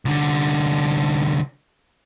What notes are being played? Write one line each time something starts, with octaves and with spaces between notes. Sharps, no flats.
C2 D3